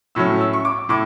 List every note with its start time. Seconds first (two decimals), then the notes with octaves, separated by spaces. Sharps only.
0.15 A2 F#3 C#4 E6
0.40 E6
0.53 C#6
0.65 D6
0.89 A2 D6